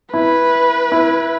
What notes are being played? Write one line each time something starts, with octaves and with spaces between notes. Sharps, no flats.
E4 B4
E4